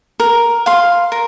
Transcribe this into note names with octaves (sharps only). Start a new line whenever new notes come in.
A#4
F5 C6
A#4